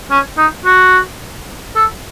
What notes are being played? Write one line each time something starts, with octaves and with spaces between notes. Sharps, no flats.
C#4
D#4
F#4
A4